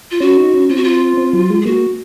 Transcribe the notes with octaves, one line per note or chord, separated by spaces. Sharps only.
F4
C#4 F#4
D#4
C#4
C4 F4
F#4
F4
C4
F#3
G#3
G#4
A#3 F#4